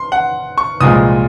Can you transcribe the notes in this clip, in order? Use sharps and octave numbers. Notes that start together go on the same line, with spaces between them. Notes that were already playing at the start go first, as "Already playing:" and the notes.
Already playing: C6
F#5
C#6
C2 A#2 F3 G#3 D#6